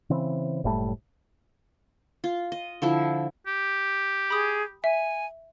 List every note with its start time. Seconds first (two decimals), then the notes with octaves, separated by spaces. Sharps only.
0.10 C#3 E3 C4
0.64 F#1 A2 G3 A3
2.24 F4
2.52 D#5
2.82 D3 F3 E4
3.47 G4
4.30 G#4 B5 D#6
4.84 E5 G#5